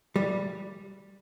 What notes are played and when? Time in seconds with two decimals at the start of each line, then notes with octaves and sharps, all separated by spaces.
0.16 G3